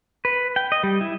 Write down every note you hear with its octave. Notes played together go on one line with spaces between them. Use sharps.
B4
G5
D#5
G3
E4